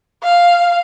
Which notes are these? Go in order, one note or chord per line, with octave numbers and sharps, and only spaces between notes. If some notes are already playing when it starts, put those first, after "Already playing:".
F5